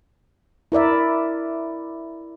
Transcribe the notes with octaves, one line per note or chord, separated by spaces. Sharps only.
E4 A#4 D5 E5